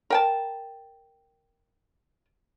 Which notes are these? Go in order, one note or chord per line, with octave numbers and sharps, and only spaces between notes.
A#4 G5 A5